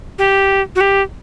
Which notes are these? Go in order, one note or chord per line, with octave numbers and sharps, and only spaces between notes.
G4
F#4
G4